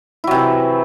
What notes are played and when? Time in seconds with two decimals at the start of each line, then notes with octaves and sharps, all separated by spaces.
0.24 E4
0.27 F#3
0.31 C3
0.35 E3